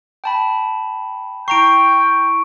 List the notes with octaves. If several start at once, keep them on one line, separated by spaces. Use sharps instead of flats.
G5 A5 B5
E4 G5 A#5 C#6 C7 D7